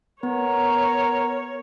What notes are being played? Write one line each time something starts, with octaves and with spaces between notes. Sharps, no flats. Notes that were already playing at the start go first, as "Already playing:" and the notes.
B3 A#4 C#5